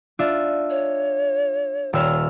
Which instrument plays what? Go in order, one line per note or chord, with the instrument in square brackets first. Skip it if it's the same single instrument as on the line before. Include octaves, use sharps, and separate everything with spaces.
[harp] D4 F4 E5
[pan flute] C#5
[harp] D#1 E6 F6 [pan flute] C#5